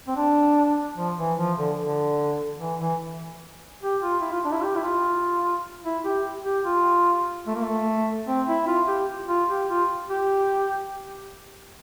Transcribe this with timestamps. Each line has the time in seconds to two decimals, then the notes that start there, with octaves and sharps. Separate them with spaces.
0.08 C4
0.16 D4
0.97 F3
1.18 E3
1.38 F3
1.58 D3
1.78 D3
2.60 E3
2.80 E3
3.82 G4
4.02 F4
4.21 E4
4.32 F4
4.45 D4
4.52 E4
4.62 G4
4.76 E4
4.83 F4
5.85 E4
6.05 G4
6.45 G4
6.65 F4
7.47 A3
7.55 A#3
7.64 A3
8.28 C4
8.48 E4
8.68 F4
8.88 G4
9.29 F4
9.49 G4
9.69 F4
10.10 G4